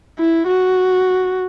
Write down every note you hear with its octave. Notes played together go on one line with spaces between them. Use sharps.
E4
F#4